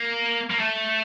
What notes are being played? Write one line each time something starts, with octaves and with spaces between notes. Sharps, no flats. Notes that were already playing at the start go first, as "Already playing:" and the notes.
Already playing: A#3
A#3
A3